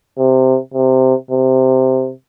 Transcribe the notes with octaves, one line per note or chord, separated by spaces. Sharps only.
C3
C3
C3